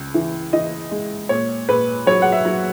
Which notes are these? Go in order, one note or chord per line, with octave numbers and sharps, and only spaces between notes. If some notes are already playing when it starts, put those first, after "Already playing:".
Already playing: C#2
E3
E3 D#5
G#3
A#2 C#5
A#2 B4
F#3 C#5
F#5
E5
F#3